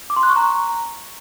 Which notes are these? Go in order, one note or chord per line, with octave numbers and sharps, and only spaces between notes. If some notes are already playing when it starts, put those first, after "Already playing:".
D6
C6
F#6
C#6
A#5